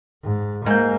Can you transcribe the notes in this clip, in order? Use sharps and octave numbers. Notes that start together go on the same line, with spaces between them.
G#2
G#2 A#3 G6